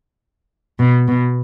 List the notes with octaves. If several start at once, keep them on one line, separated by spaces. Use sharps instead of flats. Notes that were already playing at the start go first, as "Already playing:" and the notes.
B2
B2